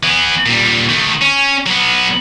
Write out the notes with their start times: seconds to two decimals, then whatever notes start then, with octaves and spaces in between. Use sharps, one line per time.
0.03 E3 B3
0.46 A#2 G3
0.89 D#3 A3
1.21 C#4
1.66 F#3 B3